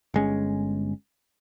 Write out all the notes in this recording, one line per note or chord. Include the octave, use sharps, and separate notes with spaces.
G1 G#3 C#4